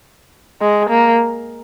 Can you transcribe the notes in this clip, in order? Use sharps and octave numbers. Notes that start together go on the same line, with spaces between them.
G#3
A#3